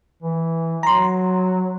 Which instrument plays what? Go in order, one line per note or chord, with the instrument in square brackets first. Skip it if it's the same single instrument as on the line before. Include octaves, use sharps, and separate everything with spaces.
[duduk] E3
[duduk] F#3 [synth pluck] A#5 C6